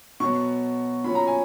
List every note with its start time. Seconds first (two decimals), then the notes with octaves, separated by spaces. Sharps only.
0.20 B2 F#3 B3 C#6
1.04 A#2 F#3 C#4 B5
1.15 A#5
1.27 G#5